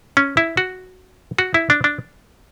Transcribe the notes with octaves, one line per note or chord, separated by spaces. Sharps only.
C#4
E4
F#4
F#4
E4
D4
D4